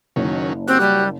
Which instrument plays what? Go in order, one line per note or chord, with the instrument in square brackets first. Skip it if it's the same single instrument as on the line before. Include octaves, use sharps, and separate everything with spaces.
[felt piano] F#1 [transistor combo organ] D#3 F#3 C#4
[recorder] C4 [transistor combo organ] F#4 G4 [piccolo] F#6
[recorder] G3